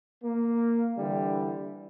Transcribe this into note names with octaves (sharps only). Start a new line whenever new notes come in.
A#3
D3 E3 G3